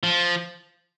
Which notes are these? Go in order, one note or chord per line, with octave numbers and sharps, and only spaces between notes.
F3